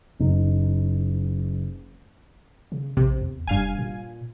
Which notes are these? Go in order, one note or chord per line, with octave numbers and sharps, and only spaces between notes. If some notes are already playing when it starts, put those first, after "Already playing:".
F#1 D#4
C#3
A#1 C3
E2
F1 G2 F5 G#5
A#2